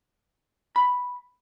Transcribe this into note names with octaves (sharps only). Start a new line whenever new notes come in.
B5